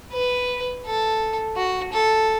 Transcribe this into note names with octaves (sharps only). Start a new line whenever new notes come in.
B4
A4
F#4
A4